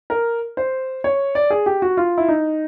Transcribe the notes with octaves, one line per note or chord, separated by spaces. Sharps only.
A#4
C5
C#5
D5
G#4
G4
F#4
F4
E4
D#4